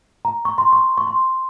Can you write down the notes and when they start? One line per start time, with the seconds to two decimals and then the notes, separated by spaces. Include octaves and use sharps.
0.25 A#5
0.45 C#6
0.58 C6
0.73 C#6
0.98 C#6
1.07 C6